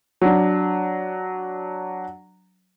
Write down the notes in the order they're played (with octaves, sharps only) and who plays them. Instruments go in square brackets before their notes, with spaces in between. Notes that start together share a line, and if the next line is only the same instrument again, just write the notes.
[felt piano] F#3 D4